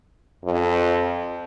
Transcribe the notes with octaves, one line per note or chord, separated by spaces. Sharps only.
F2